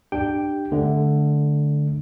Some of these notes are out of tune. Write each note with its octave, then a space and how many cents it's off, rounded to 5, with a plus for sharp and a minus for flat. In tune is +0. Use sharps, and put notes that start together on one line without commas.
D4 +20 G4 +0 G5 +0
D3 +0 A3 -25